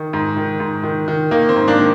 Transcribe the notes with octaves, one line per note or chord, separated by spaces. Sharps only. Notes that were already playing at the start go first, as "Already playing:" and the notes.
Already playing: D#3
G#2
D#3
G#2
D#3
D#3
D#3 A#3
C4
G#2
A#3 D4
D#3